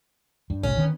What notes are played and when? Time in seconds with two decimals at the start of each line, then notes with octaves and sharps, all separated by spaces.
0.50 G2
0.63 F#1 B1 G#2 C#4
0.77 D#3 B3